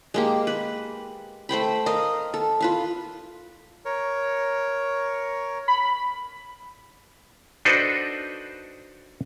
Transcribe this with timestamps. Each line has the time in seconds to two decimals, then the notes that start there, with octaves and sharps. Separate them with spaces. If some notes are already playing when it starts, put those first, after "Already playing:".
0.14 G#3 A#3 G4
0.47 B4
1.49 A3 C5 G5 B5
1.86 A#4 D#5 F5
2.34 A4
2.61 F4 B4 F5
3.85 A#4 C#5
5.68 B5
7.65 D4 D#4 F#4 A4 B4 C5